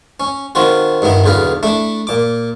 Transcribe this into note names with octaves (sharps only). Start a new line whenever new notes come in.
C#4
D#3 C4 F4 F#4
G2 D#3 B3 E4
B1 E2 D3 B4 F5
A3 D4 E4
A#2 D6